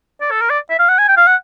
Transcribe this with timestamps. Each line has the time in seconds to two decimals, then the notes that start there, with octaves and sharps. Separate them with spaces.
0.21 D5
0.31 A4
0.41 A#4
0.50 D5
0.70 E5
0.79 F5
0.89 F#5
0.99 G#5
1.08 G5
1.17 F5
1.27 F#5